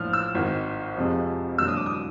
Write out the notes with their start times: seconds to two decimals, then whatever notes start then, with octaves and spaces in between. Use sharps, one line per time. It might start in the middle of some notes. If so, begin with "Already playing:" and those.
Already playing: A#1 A2 F3 F6
0.13 E6
0.35 G#1 G#2 D#3
0.97 F2 C3 F3 G#3
1.58 E1 D#2 D3 F#3 E6
1.68 D#6
1.77 D6
1.86 D#6